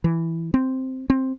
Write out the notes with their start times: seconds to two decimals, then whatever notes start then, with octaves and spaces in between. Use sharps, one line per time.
0.04 E3
0.54 C4
1.10 C4